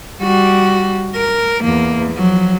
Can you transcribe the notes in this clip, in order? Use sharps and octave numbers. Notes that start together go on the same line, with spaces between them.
G3 F#4
A#4
E2 A#3
F3 F#3